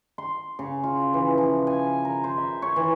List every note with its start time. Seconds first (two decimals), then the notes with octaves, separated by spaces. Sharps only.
0.18 C6
0.59 C#3
0.84 F4
1.14 E3
1.38 F3
1.67 G#5
2.05 A#4
2.24 C5
2.38 E5
2.62 C#5
2.76 E3